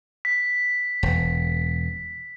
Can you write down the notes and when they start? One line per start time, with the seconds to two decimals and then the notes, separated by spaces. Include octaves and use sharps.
0.25 B6
1.03 E1